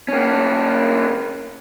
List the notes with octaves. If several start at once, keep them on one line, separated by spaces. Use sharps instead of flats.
A#3 C#4